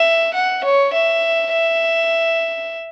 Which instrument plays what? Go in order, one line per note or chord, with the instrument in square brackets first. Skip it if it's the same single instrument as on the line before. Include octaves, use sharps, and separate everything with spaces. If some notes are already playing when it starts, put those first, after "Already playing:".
Already playing: [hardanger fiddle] E5
F#5
C#5
E5
E5